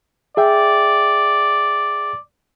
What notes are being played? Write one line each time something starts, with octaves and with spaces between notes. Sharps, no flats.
G#4 D5 E5 G5